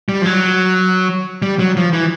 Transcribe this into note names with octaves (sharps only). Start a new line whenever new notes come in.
G3
F3
F#3
G3
F#3
F3
E3